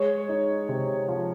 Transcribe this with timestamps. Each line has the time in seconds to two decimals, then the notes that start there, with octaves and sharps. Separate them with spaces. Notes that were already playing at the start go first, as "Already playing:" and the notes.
Already playing: G#3 C#5
0.29 D#4
0.69 C3
1.08 F3